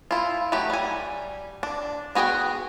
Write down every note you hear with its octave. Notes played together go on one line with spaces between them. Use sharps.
E4 F4
E3 F#3 A3 G4
G3 G#5
D4
B3 F#4 G#4 B4 G5